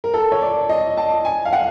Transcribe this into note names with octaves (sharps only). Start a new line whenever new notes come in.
A#4
A4
C#5
D5
D#5
A5
G#5
F5
F#5